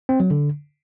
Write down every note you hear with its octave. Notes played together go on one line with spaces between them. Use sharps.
C4
F#3
D3